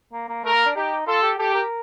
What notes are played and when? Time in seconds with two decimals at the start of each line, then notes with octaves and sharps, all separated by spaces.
0.13 A#3
0.28 A#3
0.44 A3 A#4
0.54 A#3
0.65 D4
0.75 D#4 G4
1.07 F4 A4
1.22 G4
1.38 G4 A4
1.54 A#4